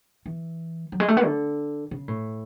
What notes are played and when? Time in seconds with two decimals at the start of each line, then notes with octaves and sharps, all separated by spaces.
0.26 E3
0.92 F#3
1.00 G#3
1.08 A3
1.17 B3
1.25 D3
1.91 C#3
2.08 A2